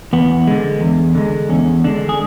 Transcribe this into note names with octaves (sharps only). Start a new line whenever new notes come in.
E2 B3
D3 G#3
E2
D3 G#3
E2 C#4
D3 G#3 D4
G#4